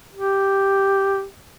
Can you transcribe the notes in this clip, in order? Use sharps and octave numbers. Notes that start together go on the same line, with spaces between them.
G4